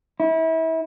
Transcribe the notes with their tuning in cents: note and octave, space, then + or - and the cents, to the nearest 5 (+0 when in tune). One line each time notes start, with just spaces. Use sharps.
E4 -30